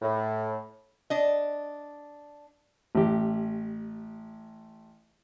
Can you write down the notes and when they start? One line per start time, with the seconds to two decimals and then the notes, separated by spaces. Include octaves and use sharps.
0.02 A2
1.10 D4 D#5
2.95 A1 G4